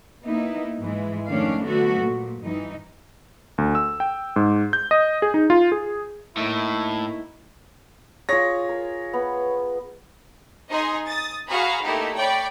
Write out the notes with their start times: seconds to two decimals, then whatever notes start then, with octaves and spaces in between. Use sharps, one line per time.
0.24 A#3 B3 D#4 E4
0.79 G#2 E3 G#3
1.27 F2 D#3 A3 C#4 D4 F5
1.61 D3 F#3 A3 B3 F#4 A4
2.02 A#2
2.41 G2 E3 D#4
3.58 D2
3.75 E6
4.00 G5
4.36 G#2
4.73 G6
4.91 D#5
5.22 G#4
5.34 D#4
5.50 F4
5.72 G#4
6.37 A2 A#3 D#4 E4
8.29 F4 G#4 C#5 A#6
8.69 A#4
9.13 B3
10.70 D#4 G#4 D#5 G#5 C6
11.06 D#6 A6
11.49 F#4 G#4 F5 A#5 B5
11.84 A3 A#3 D#4 E4 G4
12.15 C#5 D5 G5 B5